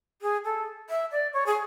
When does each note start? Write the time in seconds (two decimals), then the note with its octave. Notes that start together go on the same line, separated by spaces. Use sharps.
0.22 G#4
0.44 A4
0.90 E5
1.11 D5
1.33 C#5
1.46 G#4